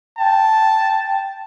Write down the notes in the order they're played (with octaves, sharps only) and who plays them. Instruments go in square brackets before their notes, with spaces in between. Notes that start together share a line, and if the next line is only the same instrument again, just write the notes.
[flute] G5 [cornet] A5